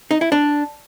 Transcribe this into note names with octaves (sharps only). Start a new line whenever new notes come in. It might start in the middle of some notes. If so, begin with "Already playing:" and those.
D#4
E4
D4